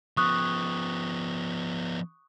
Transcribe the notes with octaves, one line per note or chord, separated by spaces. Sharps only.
F3 B3 C#6 D#6 F#6